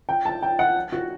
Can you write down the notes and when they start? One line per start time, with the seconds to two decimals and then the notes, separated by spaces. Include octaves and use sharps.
0.09 G5
0.25 A5
0.43 G5
0.59 F#5
0.92 F#4